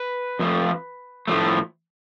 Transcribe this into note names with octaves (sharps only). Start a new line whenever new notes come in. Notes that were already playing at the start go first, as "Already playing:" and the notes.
Already playing: B4
F2 F3 A3
A2 F3 A3